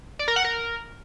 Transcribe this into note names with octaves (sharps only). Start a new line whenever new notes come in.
D5
A#4
F#5
A#4